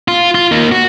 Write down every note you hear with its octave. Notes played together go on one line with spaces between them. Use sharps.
F4
F4
A#3 D#4
F#4